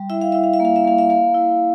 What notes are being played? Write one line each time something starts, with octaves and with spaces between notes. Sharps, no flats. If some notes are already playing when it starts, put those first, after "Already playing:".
Already playing: G3
E4 E5
F5
E4 E5
F5
E5
A#3
F5
E5
A#3 F5
E5
A#3 F5
E4